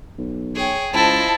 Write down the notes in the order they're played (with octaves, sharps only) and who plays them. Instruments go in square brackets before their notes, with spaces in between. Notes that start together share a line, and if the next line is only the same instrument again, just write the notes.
[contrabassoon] B1
[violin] G#4 [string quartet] C#5 G5
[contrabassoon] C#2 [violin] E4 [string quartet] F4 C5 D#5 [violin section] A5